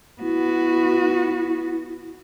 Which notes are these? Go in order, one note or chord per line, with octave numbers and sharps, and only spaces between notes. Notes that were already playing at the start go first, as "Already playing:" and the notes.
B3 E4 F#4